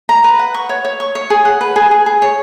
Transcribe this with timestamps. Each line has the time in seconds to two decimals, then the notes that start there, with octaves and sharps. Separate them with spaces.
0.09 A#5
0.24 B4
0.39 F#5
0.54 C#6
0.69 C#5
0.85 C#5
1.00 C#6
1.15 C#5
1.30 G#4
1.45 F#5
1.61 B4
1.76 G#4
1.91 G#4
2.06 G#4
2.22 C#5